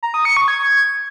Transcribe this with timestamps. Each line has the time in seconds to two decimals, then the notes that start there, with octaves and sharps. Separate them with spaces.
0.03 A#5
0.14 D#6
0.25 C#7
0.37 C#6
0.48 G#6